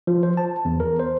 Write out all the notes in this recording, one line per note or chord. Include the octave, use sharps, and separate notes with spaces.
F3
C5
A5
E2
A#4
C5